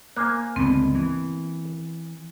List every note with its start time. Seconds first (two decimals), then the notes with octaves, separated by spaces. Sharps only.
0.16 A#3 C5 G#5 F#6
0.56 C#2 G2 D3 B3 C4
0.94 E3